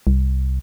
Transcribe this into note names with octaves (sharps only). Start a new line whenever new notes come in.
C2